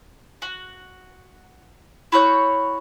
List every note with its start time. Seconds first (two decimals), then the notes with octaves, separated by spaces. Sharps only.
0.42 F#4
2.12 E4 F#4 C#5 G6